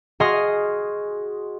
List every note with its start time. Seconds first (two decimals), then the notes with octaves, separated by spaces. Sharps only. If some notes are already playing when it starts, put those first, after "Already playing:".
0.20 F#4 G#4 D#5 C6 F6 A#6